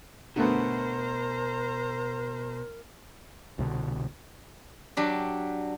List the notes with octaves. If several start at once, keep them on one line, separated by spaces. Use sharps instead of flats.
B2 D3 A3 B3 A#4 C5 A#5
C2 B2 D3
F#3 D4 G4